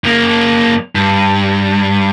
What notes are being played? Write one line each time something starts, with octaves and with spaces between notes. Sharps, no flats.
F#2 A#3
G2